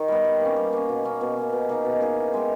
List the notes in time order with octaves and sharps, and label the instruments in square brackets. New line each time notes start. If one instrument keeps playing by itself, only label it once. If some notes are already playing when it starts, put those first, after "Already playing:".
Already playing: [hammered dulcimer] D#3
G3 B3
G3
A#3 C#4
G3
A#3 C#4
B2
A#3 C#4
B2
A#3 C#4
B2
A#3 D#4 G#4
B2
A#3 D#4 G#4
E3
G#3 B3 G4